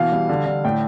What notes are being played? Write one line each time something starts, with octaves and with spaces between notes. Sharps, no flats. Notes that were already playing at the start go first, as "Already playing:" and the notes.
Already playing: B2 E3 F5
G3
D3
D3
A2 G5